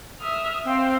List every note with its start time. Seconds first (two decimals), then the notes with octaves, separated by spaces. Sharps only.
0.20 E5 D#6 F6
0.64 C4 C5 F5 G5